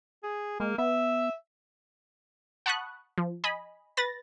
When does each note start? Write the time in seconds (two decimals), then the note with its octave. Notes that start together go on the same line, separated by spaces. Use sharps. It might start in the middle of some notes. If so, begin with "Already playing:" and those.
0.23 G#4
0.60 G#3 A#3
0.78 B3 E5
2.66 F#5 A5 B5 C#6 D#6 F#6
3.18 F3
3.44 D#5 G#5 B5
3.97 B4 B5 A6 A#6